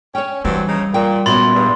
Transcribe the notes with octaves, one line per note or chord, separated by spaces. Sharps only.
C#4 C#5 G5
G2 E3 F#3 G3 C4
C#3 D#4
A#2 G5
F#2 A#2 B3 B5 C6 A6
E2 G2